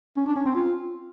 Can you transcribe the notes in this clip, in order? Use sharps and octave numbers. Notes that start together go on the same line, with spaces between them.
C#4
D4
C#4
C4
F4